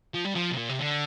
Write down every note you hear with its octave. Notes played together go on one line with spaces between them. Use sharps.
F3
G3
F3
C3
A#2
C3
D3